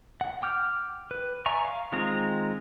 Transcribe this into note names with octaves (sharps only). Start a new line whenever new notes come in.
F#5
G5 D6 F6 G6
B4
D5 E5 G#5 A#5 C#6
F5
D#3 G#3 C4 F4 A#5